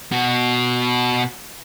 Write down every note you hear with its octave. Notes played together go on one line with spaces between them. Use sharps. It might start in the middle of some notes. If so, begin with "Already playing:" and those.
B2 F#4